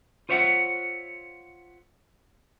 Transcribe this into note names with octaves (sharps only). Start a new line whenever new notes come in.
F4 C5 C#5 E5 F#5